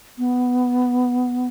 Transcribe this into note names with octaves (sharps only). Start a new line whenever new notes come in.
B3